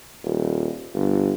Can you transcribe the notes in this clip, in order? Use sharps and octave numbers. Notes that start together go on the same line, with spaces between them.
D#1
G1